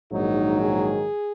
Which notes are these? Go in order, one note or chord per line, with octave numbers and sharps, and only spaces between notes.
A#1 G#2 D#3 F#3 D#4
G#4